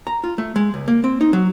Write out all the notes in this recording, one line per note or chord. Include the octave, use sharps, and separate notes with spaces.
A#5
F4
A3
G#3
C#2
A#3
C4
D#4
F#3